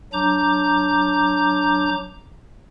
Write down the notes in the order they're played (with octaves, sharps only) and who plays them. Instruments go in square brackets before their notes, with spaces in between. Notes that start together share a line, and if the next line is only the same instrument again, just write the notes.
[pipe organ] F#3 D4 A#5 D6 G6